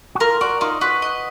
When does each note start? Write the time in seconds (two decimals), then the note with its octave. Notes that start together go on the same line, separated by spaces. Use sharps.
0.15 F#4
0.20 F4 A#4
0.41 F#4 D5
0.61 D#4 F4
0.81 F#4 B4
1.02 D#5